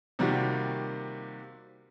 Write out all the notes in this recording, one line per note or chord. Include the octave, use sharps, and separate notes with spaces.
C3 D#3 G3 A#3 F4 F#4